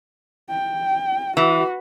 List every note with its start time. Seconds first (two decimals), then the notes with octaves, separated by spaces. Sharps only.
0.50 G5
1.37 E3 F#4